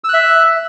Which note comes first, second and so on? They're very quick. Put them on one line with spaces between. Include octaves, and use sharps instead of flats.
E6 F#6 E5